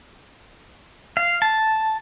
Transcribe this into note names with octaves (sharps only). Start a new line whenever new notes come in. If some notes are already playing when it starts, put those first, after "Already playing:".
F5
A5